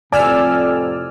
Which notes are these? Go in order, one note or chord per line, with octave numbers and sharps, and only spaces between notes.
F2 A2 C3 D5 G#5 E6 F6